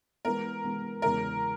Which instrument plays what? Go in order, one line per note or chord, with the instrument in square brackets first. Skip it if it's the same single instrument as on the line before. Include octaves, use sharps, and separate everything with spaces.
[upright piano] E3 G#3 B3 [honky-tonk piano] A#4
[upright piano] E3 G#3 B3
[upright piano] E2 C#3 E3 G#3 [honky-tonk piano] A#4